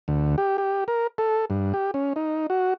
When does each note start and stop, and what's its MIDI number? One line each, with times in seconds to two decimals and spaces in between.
0.08 0.36 38
0.38 0.57 67
0.58 0.84 67
0.88 1.07 70
1.18 1.45 69
1.50 1.73 43
1.74 1.91 67
1.94 2.13 61
2.16 2.47 63
2.50 2.74 66